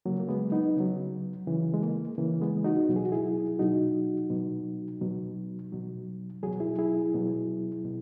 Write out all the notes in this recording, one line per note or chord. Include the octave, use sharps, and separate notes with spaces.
C#3 F#3 A#3
A#3
G#3 B3
B3 D#4
C#3 F#3
C#3 E3
G#3
A#3
C#3 E3 A#3
G#3 B3
D#4 F#4
B2 F#3
G#4
F#4
E4 G#4
B2 F#3 D#4 F#4
B2 F#3
B2 F#3
B2 F#3
B2 F#3 G#4
E4 G#4
E4 G#4
B2 F#3
B2